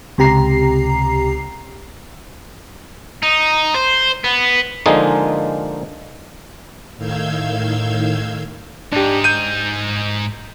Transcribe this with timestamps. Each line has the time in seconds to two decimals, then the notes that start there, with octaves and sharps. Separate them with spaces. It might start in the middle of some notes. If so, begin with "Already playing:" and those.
0.18 C#2 C3 G4 A#5 C7
3.23 D#4
3.74 C5
4.24 B3
4.86 D3 F3 G#3 A#3 D#4 G#4
6.96 A2 D#3 F5 E6 G6 G#6
8.92 G#2 D4 D#4 G4
9.24 G6 D#7